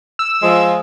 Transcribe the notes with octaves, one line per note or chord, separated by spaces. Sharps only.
E6
F3 G#3